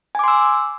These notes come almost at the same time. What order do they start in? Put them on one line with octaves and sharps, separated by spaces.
G#5 D6 C6 E6